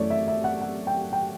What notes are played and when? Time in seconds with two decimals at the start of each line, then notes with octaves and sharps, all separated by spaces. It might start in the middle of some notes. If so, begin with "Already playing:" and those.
Already playing: F#2 E3 A3 C#4 C#5 D5
0.10 E5
0.28 E5
0.44 F#5
0.61 F#5
0.87 G5
1.13 G5